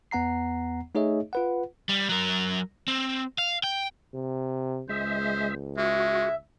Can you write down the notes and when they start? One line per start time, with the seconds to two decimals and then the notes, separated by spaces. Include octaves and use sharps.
0.11 E2 B3 F#5 A#5 C7
0.95 A3 D#4 G#4 C#5 D#5 E5
1.33 F4 B4 F#5
1.89 G3
2.09 F#3 A#4
2.88 C4
3.38 F5
3.63 G5
4.14 C3
4.89 C#2 G#3 C5 E5
5.77 G#3 F#4 E5